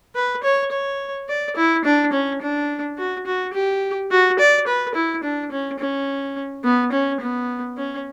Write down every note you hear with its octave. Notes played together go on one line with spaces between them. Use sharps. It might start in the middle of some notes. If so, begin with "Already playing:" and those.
B4
C#5
C#5
D5
E4
D4
C#4
D4
F#4
F#4
G4
F#4
D5
B4
E4
D4
C#4
C#4
B3
C#4
B3
C#4